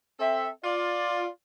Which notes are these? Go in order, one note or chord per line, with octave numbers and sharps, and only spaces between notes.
C4 A4 E5
F4 D5